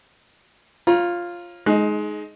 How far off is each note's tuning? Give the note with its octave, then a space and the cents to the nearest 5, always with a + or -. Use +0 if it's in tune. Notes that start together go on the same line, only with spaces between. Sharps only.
F4 +0 C#5 -30 A#5 +30
G#3 +20 D#4 +0